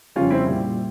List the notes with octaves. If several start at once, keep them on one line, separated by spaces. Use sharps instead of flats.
F2 C#3 G3 C#4 F4
C4 E4
A#2 G3